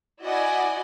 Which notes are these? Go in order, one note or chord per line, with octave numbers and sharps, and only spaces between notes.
E4 F#4 D5 D#5 F#5 G#5